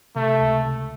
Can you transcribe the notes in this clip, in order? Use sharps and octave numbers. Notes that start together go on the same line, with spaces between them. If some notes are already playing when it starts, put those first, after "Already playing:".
C3 A3
C#2
C#2